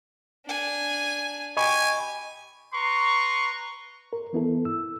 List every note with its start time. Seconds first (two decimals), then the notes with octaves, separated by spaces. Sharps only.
0.46 D4 G#5
1.57 G4 D#5 G#5 B5 C#6
2.73 B4 A#5 C6 C#6
4.13 A#4
4.33 E3 B3 E4 A4
4.65 E6